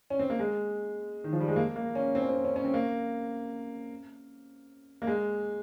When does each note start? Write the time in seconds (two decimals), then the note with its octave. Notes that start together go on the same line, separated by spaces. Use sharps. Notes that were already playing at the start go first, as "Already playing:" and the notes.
0.10 C#4
0.19 C4
0.30 A#3
0.39 G#3
1.24 D#3
1.33 F3
1.40 G3
1.48 G#3
1.56 A#3
1.76 A#3
1.95 C#4
2.15 C4
2.22 C#4
2.30 C4
2.44 C#4
2.56 C#4
2.65 C4
2.74 A#3
5.02 A#3
5.07 G#3